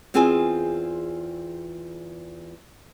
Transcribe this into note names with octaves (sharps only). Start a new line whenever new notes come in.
E2 C4 F4 G#4 G#5